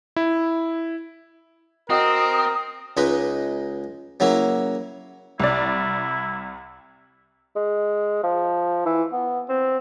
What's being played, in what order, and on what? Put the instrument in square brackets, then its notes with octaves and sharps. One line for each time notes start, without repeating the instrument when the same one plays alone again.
[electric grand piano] E4
[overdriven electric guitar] C4 [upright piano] F#4 D#5 G5 [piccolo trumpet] A#4 [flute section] D#6
[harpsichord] C#2 G#3 D#4 B4
C#3 F#3 A#3 E4
[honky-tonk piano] C2 D5 [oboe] E4
[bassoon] G#3
F3
E3
B3
C4